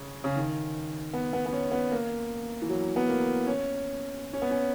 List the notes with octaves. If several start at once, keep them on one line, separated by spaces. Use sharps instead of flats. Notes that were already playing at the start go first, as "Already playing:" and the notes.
Already playing: C#3
C#3
D#3
B3
B3
B3
C#4
B3
A#3
E3
F#3
B3
A#3
C#4
C#4
B3
C#4